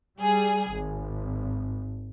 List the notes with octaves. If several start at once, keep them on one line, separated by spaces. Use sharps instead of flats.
G3 G#4
G#1